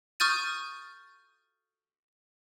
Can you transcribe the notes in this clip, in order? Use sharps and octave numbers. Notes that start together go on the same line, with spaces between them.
C#6 D#6 F6 G6 A6 D#7